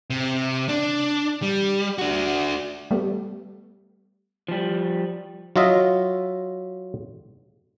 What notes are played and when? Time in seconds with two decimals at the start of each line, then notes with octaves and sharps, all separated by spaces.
0.10 C3
0.69 D4
1.42 G3
1.98 D4 F#4
2.91 G3 A3 B3
4.48 F3 G3
5.56 F#3 F4 D#5 E5